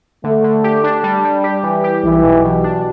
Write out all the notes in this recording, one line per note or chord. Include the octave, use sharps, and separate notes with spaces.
D3 A3
D3
G4
D4
G3
G3
G4
E3
G4
B1 E3
B2
B2
D4